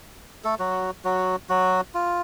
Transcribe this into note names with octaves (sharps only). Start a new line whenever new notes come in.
A3 A4
F#3 F#4
F#3 F#4
F#3 F#4
F4